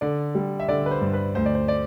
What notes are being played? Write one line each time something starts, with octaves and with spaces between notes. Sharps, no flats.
D3 D5
G3
E5
D3 D5
B4
C5
G2
B4
D2 C5
D5
C5
D5